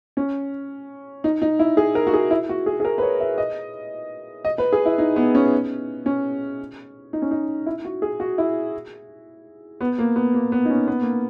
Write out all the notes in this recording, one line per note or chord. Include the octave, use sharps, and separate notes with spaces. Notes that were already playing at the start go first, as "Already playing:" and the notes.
C#4
D#4
D#4
E4
G#4
A#4
F#4
G#4
E4
F#4
G#4
G#4
A#4
B4
C#5
E5
D#5
D#5
B4
G#4
E4
D#4
B3
C#4
C#4
D#4
C#4
D#4
E4
F#4
G#4
F#4
E4
B3
A#3
B3
A#3
B3
D#4
C#4
B3
A#3